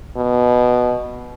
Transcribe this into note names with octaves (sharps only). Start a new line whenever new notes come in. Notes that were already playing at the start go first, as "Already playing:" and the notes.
B2